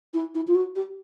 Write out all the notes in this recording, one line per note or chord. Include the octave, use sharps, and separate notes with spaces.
E4
E4
F4
F#4
G4